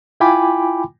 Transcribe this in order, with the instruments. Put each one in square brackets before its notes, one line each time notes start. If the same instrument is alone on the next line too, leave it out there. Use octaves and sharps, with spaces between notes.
[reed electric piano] E4 F4 G5 G#5 B5 D6